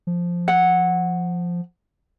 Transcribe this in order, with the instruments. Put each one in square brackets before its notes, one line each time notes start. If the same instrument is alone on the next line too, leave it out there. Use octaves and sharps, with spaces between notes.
[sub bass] F3
[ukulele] F#5